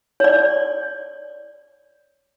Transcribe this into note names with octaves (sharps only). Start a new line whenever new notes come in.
C#5 D5